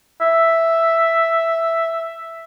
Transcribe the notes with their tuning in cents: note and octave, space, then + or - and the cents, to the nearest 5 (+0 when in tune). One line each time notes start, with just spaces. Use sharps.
E5 +0